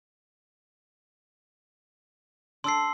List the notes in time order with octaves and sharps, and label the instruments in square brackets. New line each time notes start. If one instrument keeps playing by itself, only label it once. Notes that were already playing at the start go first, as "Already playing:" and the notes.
[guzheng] D4 D5 [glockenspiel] C6 E6 C7